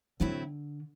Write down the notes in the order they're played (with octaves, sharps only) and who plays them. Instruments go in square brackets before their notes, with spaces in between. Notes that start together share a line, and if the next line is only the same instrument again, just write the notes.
[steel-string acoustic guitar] A2 F#3 C4 E4 [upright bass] D3